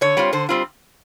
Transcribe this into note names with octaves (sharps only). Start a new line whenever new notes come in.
D3 C#5
G3 C4 F4
D3 C5
G3 C4 F4